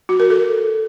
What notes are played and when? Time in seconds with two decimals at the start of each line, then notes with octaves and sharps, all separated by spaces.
0.09 F#4
0.20 A#4
0.30 A4